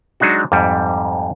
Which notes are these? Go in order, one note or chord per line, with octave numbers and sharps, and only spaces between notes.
F#3 G#3 D4 D#4 F#4
F2 G#2 G3